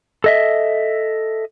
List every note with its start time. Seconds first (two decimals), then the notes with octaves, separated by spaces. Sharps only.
0.24 A4 D#5 E5